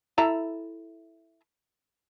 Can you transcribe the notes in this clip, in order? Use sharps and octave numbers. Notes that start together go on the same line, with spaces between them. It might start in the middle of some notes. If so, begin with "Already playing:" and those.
E4 A4 A#5